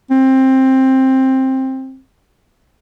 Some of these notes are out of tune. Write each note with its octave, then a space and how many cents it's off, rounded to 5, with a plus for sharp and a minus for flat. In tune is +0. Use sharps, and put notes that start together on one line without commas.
C4 +15